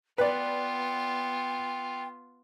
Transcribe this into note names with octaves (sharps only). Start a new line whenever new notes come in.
B3 F4 B4 D5 G5